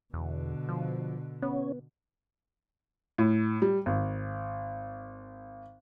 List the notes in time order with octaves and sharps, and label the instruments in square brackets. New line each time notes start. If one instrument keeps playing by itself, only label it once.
[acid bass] E2 [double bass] B2 D3
[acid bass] F3
[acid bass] B3 [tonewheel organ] C#4
[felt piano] A2
G3
G#1